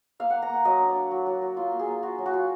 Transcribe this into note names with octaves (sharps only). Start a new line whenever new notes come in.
A#3 F5
A#3 F#5
A#5
A#3 F#5
F#3 D#5
D4
D5
D4
F#3
F#3
F#3
F4
A#3
G#4
A#3
F4 F#4
F#3
F#4
F4